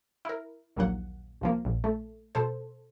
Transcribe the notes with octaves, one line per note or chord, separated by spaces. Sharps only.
E4 A#4
A#1 D#2 F#3 A#3 F#5
C2 F3 A#3
A#1
A3
B2 A4 C5